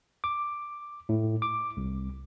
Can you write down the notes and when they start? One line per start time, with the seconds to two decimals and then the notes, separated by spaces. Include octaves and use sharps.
0.24 D6
1.09 A2
1.42 D6
1.77 C2